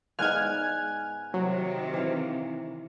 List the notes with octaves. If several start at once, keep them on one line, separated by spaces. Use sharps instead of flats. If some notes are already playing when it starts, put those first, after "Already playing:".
G#2 B3 D5 G#5 F6 F#6 G#6
C3 D#3 F#3
E3 F5